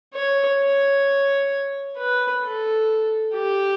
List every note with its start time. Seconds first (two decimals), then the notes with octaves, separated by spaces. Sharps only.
0.14 C#5
0.60 C#5
1.97 B4
2.43 A4
3.35 G4